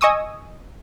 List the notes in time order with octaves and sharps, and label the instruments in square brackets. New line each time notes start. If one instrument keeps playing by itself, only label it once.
[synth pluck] D#5 G#5 C#6 D#6 E6